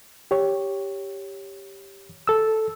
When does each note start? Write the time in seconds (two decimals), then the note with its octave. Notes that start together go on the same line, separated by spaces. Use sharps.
0.31 G4 C#5
2.27 A4 E6